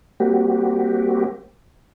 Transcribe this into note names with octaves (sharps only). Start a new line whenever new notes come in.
G3 A#3 C4 F#4 G4